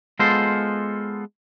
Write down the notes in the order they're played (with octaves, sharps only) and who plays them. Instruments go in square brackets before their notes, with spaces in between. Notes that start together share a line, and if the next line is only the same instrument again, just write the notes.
[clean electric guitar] G#3 B3 F4 A4 C5